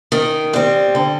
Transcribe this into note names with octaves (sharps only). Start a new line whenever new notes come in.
D#3
G3 C4
D3